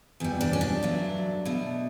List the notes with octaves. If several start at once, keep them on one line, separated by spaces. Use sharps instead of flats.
E2 B2 G3
D4
C#4
D4
G2 F#3 A3
B2 A3